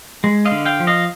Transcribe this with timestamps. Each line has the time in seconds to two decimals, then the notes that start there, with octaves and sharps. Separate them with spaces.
0.24 G#3
0.45 D#5 F5
0.52 D3
0.65 F5 G5
0.80 F3
0.87 D#5 F5